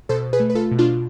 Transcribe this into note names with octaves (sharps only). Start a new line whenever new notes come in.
B2 A4 C5
G#4 B4
A3
B4
F4 A4
B2
D4 F4